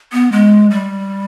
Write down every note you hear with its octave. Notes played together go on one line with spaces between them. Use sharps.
B3
G#3
G3